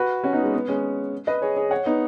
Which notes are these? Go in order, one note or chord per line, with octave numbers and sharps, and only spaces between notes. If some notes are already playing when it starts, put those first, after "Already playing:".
Already playing: F#4 B4
C#4 F#4
B3 D#4
G#3
B3
G#3 C#4
B4 D#5
G#4 C#5
G#4 C#5
C#5 F#5
B3 D#4